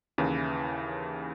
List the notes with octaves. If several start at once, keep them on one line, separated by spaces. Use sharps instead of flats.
D#2 C#3 E3